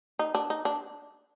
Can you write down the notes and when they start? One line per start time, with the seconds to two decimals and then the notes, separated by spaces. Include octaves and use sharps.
0.19 D#4
0.35 D4
0.50 D#4
0.65 D4